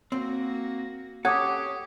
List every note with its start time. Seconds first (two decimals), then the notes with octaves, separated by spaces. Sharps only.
0.12 A#3 C4 F#4
1.25 C#4 G4 A4 F#5 D6 D#6 G#6